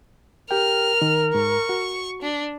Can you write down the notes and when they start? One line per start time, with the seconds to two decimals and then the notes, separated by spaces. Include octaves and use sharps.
0.51 G4 A#4 G5 F6
1.02 D#3
1.35 G#2 C#6
1.69 F#4
2.22 D4